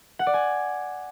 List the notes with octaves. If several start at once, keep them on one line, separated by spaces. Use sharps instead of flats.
F#5
D5
G#5